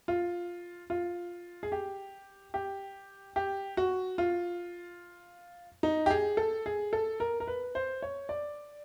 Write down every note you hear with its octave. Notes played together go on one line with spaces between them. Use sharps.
F4
F4
G#4
G4
G4
G4
F#4
F4
D#4
G4
G#4
A4
G#4
A4
A#4
A#4
B4
C5
C#5
D5